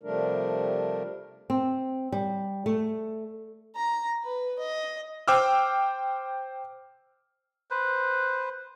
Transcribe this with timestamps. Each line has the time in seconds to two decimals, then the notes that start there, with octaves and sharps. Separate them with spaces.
0.03 C3 F3 G3 A3 D4 A#4
1.50 C4
2.12 G3
2.66 A3
3.76 A#5
4.24 B4
4.59 D#5
5.28 C5 G5 D6 E6 F6
7.71 B4 C5